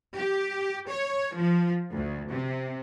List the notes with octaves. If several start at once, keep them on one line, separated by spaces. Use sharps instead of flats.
G4
C#5
F3
D2
C3